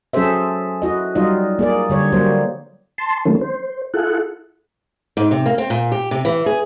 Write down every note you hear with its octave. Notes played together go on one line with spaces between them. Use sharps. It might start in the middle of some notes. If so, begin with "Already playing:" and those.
F#3 C#4 G#4 A4 C5 E5
E4 F#4 D#5
F#3 G3 D#4 F4 D#5
A#3 G#4 D5
D3 G3 C#5
F#3 G3 A#3 C5
A5 C6
D#3 F#3 A3 A#3 C#4
C5
E4 F4 G#4 A4 F#5
G#2
C3
A#3
C4
A#2
G4
C3
E3
G#4